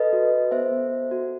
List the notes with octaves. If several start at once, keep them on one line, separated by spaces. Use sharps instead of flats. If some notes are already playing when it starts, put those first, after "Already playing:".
Already playing: A4 B4 D#5
F#4
A4
B3 C5 E5
B3
A4
F#4